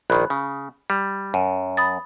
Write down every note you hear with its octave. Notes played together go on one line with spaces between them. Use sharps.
A#1 D#3 B5 F#6
C#3
G3
F#2
B5 D#6 A6